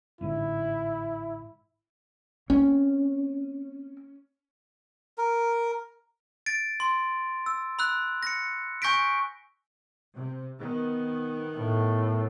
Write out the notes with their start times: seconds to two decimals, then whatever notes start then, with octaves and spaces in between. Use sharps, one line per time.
0.21 A1 G#2 D3 E4
2.50 A#3 C4 C#4
5.18 A#4
6.46 A6 D7
6.80 C6
7.46 E6
7.79 B5 E6 F#6
8.23 A#6 C#7
8.82 G#5 C#6 G6 A#6 B6 D7
10.14 C3
10.58 D#3 B3
11.57 A2